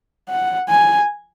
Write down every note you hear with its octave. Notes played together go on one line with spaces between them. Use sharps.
F#5
G#5